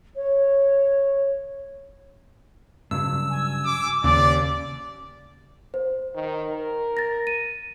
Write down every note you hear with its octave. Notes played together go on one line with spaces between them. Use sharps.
C#5
G2 C#3 F#3 E6
G#5
D6
D#2 C#3 D5 D6
C5
D#3
A#4
A6 A#6
D#7